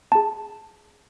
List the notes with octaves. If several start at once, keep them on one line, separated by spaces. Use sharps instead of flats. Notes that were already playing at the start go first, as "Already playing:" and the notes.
G#4 A5